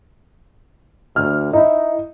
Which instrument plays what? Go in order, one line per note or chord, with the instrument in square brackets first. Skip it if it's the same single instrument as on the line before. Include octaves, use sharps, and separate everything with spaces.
[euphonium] D2 [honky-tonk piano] F6
[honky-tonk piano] D#4 [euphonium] E4